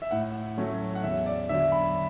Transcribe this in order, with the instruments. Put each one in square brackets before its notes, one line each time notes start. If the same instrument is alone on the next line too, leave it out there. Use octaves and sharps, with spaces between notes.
[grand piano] E5
A2 F#5
F#3 A3 C#4
F#5
E2 E5
D5
D3 F#3 E5
B5